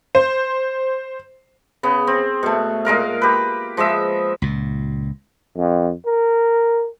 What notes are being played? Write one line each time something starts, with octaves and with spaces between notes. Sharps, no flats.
C5
C#3 B3
C4
B2 A3
A#2 G#3 A#4 F5
G4 B4
F3 G#3 D#5 E5
C#2 A#2
F2
A#4